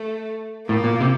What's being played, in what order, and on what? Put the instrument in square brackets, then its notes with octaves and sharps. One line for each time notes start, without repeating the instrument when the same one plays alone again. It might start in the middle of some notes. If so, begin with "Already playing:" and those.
Already playing: [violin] A3
[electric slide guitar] A2 [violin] A#3
[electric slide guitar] A#2
C3